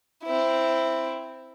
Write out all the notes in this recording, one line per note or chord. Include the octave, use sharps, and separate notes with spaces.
C4 E4